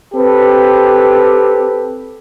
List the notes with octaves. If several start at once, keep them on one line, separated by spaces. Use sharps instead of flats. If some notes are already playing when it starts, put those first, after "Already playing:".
C4 G4 A4 B4